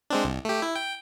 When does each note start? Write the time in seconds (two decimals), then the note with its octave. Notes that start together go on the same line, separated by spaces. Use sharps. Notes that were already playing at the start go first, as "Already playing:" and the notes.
0.10 G#3 C4 D4
0.24 C2
0.45 A3 G4
0.62 E4
0.76 G5